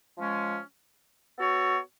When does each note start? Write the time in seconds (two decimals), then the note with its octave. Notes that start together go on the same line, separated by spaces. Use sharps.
0.17 F3 G#3 C#4
1.36 B3 F#4 A4 C#5